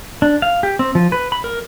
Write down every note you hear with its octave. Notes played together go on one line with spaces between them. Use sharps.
D4
F5
G4
C4
F3
B4
B5
A#4